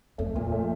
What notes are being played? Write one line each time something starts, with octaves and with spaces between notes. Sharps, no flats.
F2 A3
F2 A#2
A3